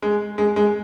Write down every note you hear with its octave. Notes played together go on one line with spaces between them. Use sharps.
G#3
G#3
G#3